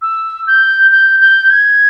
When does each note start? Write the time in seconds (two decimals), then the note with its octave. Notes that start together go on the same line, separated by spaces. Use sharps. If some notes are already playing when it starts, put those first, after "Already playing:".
0.02 E6
0.47 G6
0.91 G6
1.20 G6
1.50 G#6